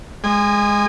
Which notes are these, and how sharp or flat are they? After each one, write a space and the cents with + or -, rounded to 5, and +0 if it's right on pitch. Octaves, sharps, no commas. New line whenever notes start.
G#3 -5 G#5 -25 D#6 -35